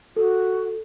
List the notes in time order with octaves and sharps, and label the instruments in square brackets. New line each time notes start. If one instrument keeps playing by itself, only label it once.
[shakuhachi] F#4 [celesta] A4